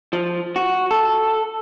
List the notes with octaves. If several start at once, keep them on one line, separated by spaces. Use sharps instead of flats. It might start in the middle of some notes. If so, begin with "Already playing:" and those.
F3
F#4
A4